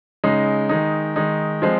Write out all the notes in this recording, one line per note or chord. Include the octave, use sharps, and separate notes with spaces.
C#3 G#3 D#4
D#3 G#3 D#4
D#3 G#3 D#4
F3 G#3 C4